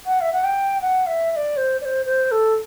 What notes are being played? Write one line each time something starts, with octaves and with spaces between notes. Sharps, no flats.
F#5
E5
F#5
G5
F#5
E5
E5
D5
C5
D5
C5
C5
A4